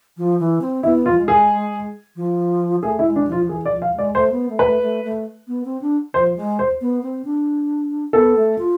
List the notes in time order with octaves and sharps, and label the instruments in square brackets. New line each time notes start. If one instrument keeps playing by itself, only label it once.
[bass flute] F3
E3
C4
[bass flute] B3 [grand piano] E4
[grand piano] F4
[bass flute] F3
G#3
[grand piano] G#4
[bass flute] F3
[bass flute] A3 [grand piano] G#4
[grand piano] E4
[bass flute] G#3
[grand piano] D4
[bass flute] F3 [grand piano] F4
[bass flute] E3 [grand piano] G#4
[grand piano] D5
[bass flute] F3
[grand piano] F5
[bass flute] G#3
[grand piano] D5
[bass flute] A3 [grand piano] C5
[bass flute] B3
A3
[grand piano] B4
[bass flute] A3
A3
A3
B3
C4
D4
[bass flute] F3 [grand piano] C5
[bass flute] G#3
[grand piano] C5
[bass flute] B3
C4
D4
[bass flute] B3 [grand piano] A4
[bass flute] A3
F4